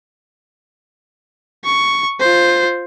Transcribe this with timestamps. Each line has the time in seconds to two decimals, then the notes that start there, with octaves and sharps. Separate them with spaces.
1.65 C#6
2.20 F4 C5